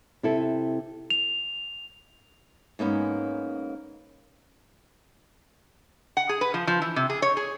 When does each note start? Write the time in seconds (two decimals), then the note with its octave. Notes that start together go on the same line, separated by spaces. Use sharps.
0.23 C3 E4 A4
1.10 F7
2.79 G#2 A#3 B3 C#4
6.17 F#5
6.29 G#4
6.41 B4
6.54 F3
6.67 F3
6.82 E3
6.96 C3
7.10 G#4
7.22 C#5
7.37 G#4